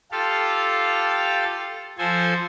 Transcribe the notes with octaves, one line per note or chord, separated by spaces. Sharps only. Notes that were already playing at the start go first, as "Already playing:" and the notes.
F4 G4 A4 F5
F3 A4 C5 G#5